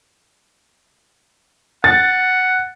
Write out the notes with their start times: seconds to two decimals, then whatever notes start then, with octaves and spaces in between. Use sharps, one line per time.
1.84 F#5 A6